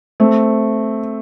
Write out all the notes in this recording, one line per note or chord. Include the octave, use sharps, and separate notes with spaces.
A3 C4